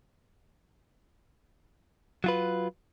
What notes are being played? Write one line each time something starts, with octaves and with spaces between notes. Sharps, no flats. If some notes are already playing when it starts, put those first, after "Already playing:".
F#3 F4 B4